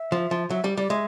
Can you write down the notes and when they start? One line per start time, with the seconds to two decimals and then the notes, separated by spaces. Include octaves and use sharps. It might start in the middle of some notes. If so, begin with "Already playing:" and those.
Already playing: E5
0.12 F3
0.31 F3
0.50 F#3 E5
0.64 G3
0.77 G3 D5
0.90 G#3 E5